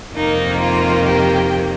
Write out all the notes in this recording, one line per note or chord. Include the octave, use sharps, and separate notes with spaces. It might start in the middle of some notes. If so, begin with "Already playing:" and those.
F2 C3 D#3 A#3 D#4
F4
G4